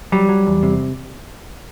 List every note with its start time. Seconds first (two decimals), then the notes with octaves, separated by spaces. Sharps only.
0.12 F#3 G3
0.29 F#3
0.47 E2
0.63 C3